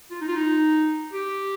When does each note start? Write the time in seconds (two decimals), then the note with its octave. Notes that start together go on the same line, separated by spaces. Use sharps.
0.11 F4
0.21 D#4
0.28 F4
0.36 D#4
1.13 G4